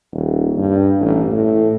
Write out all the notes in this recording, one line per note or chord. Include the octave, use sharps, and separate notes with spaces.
D#1
G2
A1
A2